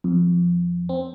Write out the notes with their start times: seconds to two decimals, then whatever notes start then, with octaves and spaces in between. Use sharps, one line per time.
0.04 F2
0.89 C4